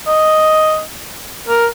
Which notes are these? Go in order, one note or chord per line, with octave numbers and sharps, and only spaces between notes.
D#5
A#4